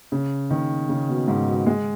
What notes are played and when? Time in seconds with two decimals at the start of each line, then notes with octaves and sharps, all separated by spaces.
0.12 C#3
0.51 D#3
0.89 C#3
1.09 B2
1.28 G#2
1.47 B2
1.66 G#3